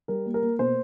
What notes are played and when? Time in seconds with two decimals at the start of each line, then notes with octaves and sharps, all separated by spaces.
0.08 G3 A#4
0.26 A#3
0.34 A#4
0.43 A#3
0.59 B2 C5